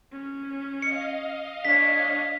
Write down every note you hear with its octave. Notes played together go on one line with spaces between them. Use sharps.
C#4
D#5 F5 C#7
D4 C#5 B6